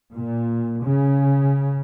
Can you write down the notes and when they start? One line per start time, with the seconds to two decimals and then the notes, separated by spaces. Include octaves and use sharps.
0.14 A#2
0.85 C#3